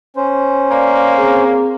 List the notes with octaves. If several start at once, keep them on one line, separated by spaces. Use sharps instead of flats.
C#4 C5
A#3 D5
C4 G#4